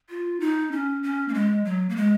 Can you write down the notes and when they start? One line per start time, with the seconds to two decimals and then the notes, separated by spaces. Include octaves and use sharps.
0.10 F4
0.40 D#4
0.72 C#4
1.03 C#4
1.28 A#3
1.34 G#3
1.65 F#3
1.89 A#3
1.96 G#3